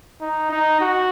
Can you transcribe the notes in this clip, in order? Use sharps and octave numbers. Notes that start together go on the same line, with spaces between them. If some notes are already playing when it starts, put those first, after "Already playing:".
D#4
D#4
F#4